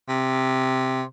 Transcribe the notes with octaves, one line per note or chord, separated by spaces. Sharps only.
C3